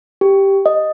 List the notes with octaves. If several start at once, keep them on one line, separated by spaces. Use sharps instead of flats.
G4
D#5